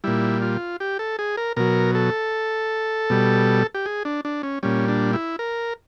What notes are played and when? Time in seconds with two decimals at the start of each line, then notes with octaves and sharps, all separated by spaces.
0.04 A#2 G3 E4
0.42 F4
0.80 G4
0.99 A4
1.19 G#4
1.37 A#4
1.57 B2 F#3 A#4
1.95 A4
3.10 B2 G3
3.75 G4
3.86 G#4
4.05 D4
4.25 D4
4.43 C#4
4.63 A#2 G3 C#4
4.88 D4
5.13 E4
5.39 A#4